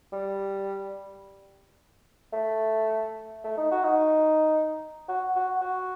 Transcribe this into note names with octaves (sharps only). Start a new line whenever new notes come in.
G3
A3
A3
D#4
F#4
D#4
F#4
F#4
F#4